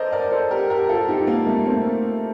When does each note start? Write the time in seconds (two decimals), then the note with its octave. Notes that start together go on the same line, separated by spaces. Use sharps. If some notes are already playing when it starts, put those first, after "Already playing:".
Already playing: A4 A#4 C5 D5 D#5
0.12 A#4 D5
0.32 A4 C5
0.51 G4 A#4
0.70 G4 A#4
0.89 F4 A4
1.09 D#4 G4
1.27 A#3
1.47 A3
1.66 A3 C4